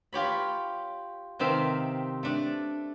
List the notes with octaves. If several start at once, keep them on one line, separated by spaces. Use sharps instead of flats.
F4 G4 C#5 B5
C3 D#3 C4 E5 F5
A3 D4